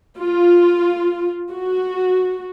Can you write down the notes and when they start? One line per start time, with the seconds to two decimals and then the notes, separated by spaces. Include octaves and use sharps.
0.17 F4
1.52 F#4